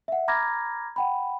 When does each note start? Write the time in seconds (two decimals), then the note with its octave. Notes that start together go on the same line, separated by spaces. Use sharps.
0.08 E5 F#5
0.28 A#5 B5 D6 F6 G#6 A#6
0.96 F#5 G5 B5